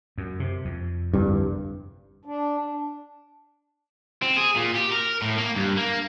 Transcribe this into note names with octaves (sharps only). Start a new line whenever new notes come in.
F#2
C3
F2
G1 C2 G2
D4
C4
G#4
A#2
G4
A#4
A2
A#3
G2
A#3